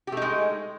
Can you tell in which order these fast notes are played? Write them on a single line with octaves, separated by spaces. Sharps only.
G4 A3 D#4 G#3